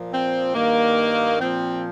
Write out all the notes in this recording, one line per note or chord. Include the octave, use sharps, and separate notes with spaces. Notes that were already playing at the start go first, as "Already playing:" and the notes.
Already playing: A#2 F3
C4
G2 D#3 A#3
A#2 F3 C4